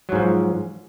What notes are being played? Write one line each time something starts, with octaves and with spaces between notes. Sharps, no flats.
G#2 F3 F#3